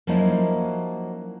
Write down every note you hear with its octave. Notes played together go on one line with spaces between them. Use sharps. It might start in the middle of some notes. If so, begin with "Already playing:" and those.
F3 F#3 A#3 C#4 D#4 E4